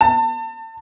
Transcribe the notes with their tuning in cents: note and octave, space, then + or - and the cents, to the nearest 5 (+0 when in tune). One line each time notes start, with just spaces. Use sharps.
A5 +25